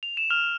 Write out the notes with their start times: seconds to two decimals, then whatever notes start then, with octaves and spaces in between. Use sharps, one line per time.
0.03 F7
0.17 E7
0.30 F6 F7